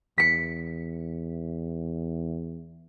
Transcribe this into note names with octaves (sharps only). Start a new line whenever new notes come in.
E2 B6 C#7